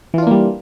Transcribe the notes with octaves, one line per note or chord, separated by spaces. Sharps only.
E3 G3 A#3 D4 F4